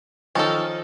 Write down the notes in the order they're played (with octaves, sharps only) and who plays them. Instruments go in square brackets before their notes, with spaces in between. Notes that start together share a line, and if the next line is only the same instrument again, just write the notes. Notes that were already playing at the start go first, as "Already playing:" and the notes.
[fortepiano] D#3 F3 D#4 [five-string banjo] C#4 A4